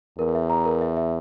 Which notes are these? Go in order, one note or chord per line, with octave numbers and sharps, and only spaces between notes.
E2 A#4
E5
A#5
A#4
E5
E5